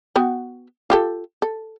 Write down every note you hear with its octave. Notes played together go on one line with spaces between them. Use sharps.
B3 F#4 G5
F4 G4 A4
A4